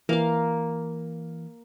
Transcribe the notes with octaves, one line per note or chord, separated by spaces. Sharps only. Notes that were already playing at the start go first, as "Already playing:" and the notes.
E3 A#3 F5